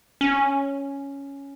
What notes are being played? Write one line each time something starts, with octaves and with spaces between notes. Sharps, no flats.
C#4